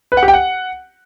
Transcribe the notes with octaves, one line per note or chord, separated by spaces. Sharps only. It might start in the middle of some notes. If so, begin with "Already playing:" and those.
B4
F#5
G4
G5
F#5